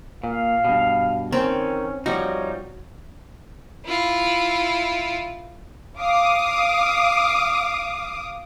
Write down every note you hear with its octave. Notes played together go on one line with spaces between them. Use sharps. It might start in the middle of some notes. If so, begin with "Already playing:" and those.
A#2 F5
G2 B2
D#3 C4 C#4
F3 G3 D#4 F#4 C#5
E4 F4
F5 D6 D#6